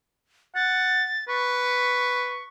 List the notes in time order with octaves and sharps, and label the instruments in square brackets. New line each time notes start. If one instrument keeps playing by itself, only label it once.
[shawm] F#5 [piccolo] A6
[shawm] B4 [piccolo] C#6